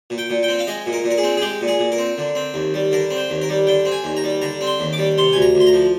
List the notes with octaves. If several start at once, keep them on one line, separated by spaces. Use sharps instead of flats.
A#2
G5
A#2
G5
C4
F5
G#3 D#5
A#2
A#4
A#2
A#4
G#4
C4
G#4
G#3 G4
A#2
G#4
A#2
A#4
C4
D3
C4
D#2
G3
D3 A#4
C4
C5
D#2
A#4
G3
D3 G5
C4
G#5
D#2
A#5
G3
D3 A#5
C4
C6
D#2
D6
G3
C3 C6
D2 G#5
A#5
D2
C6
A#5
F3